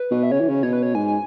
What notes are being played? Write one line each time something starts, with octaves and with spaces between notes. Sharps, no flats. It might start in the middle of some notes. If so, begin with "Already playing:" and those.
Already playing: B4
B2
E5
C#3 C#5
E3
C#3
B2 C#5
B4
C#5
G#2 G#5